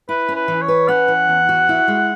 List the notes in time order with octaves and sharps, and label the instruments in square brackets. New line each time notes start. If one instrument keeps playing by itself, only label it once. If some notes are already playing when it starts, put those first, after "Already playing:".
[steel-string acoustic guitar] E4 [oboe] B4
[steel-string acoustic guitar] C#4
[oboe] B4
[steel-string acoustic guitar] E3
[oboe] C#5
[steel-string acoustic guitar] B4
[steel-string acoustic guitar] C#4 [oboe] F#5
[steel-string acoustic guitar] E3
E2
F#4
E4
G#3